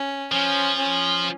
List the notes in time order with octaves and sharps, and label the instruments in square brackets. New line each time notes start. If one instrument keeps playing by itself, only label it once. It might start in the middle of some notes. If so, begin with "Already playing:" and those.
Already playing: [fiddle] C#4
[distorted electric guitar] F3 [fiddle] C#4
[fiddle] C#4